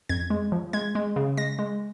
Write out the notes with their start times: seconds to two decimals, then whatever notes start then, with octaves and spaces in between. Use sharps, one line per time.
0.09 F2 G#6
0.30 G#3
0.52 F3
0.73 G#3 G#6
0.95 G#3
1.16 C#3
1.37 G#3 A#6
1.59 G#3